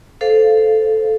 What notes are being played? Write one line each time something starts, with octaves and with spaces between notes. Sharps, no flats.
A4 C5 F5